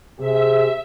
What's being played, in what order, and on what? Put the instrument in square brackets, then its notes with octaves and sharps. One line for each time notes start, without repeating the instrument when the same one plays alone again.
[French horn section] C3 G4 G#4 [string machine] E5